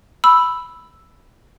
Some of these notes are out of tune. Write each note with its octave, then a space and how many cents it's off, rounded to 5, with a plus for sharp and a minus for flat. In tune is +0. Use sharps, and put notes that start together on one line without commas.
B5 +0 E6 +0